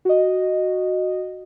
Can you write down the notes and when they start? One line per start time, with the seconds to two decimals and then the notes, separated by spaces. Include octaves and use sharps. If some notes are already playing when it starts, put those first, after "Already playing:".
0.05 F#4 D#5